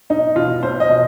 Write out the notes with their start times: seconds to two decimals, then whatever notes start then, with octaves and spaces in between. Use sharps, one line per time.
0.10 B1 D#4
0.36 B2 F4
0.63 B1 C5
0.80 D#5
0.89 B2